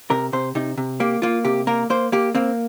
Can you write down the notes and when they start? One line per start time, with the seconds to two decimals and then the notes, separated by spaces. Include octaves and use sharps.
0.10 C3 A#4
0.33 C3 C5
0.55 C3 D#4
0.77 C3
1.00 A#3 G4
1.22 A#3 F4
1.45 C3 G4
1.67 A#3 A#4
1.90 A#3 C5
2.12 A#3 G4
2.34 A#3 C4